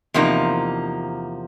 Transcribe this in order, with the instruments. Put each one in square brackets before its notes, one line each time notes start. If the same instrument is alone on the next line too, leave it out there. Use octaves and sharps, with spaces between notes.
[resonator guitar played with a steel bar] E2 C3 F3 A#3 D#4